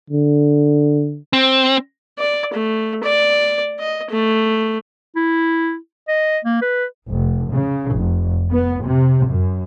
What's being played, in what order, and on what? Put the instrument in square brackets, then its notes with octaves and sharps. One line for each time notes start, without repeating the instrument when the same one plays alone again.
[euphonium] D3
[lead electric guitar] C4
[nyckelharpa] D5
A3
D5
D#5
A3
[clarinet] E4
D#5
A#3
B4
[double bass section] F1
C#3
F1
B3
C3
F#2